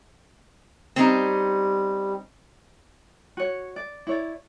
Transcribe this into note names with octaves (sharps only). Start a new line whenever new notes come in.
G3 C4 C#4 D#4
F#4 C#5
D5
E4 C#5 D5